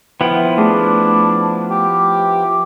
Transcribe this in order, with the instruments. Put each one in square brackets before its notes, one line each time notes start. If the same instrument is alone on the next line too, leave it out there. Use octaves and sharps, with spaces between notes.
[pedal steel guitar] F3 B3 E4 [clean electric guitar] F#5 G5
[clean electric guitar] A3 G#4 [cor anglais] D4
[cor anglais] G4